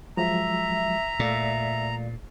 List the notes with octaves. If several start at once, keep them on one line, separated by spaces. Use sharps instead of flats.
F3 F#3 G#3 E5 A#5
A#2 A3 D5 F5